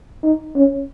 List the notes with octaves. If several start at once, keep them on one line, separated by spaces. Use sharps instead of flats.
D#4
C#4